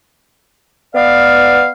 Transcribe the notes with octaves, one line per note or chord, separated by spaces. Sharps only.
B3 D5 F5